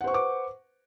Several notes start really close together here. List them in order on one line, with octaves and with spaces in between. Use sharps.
F#5 C5 C#6 B4 D6